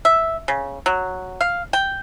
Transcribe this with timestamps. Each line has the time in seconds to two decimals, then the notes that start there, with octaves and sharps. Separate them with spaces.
0.05 E5
0.48 C#3
0.86 F#3
1.41 F5
1.73 G5